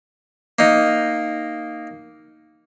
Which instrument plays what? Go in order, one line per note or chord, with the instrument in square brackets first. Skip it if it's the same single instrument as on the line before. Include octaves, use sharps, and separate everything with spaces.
[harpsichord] A#3 D#4